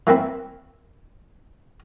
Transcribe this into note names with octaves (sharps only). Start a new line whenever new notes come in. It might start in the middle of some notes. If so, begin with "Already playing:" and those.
E3 A#3 C4 E4